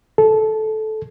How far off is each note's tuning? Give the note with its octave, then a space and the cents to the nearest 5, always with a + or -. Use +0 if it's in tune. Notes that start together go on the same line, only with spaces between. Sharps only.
A4 -15